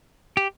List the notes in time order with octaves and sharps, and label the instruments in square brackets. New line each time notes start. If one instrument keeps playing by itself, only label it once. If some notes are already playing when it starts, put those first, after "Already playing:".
[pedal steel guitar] G4